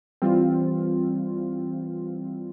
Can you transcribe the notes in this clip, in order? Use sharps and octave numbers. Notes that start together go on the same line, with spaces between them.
E3 G3 C4 F4